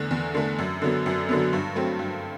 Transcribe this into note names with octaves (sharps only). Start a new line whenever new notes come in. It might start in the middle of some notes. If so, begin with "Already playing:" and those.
Already playing: E2 D3 A3
E2
D3 A3
F#2
D3 F#3 B3
F#2
D3 F#3 B3
G2
F#3 A3 C4
G2